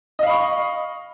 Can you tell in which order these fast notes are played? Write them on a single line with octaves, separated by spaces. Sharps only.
D#5 F5 B5 C#6